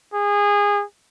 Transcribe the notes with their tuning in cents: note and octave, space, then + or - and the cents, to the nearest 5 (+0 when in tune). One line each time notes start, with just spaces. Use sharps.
G#4 -25